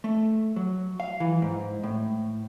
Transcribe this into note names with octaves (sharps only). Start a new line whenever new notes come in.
A3
F#3
F5
E3
G#2
A2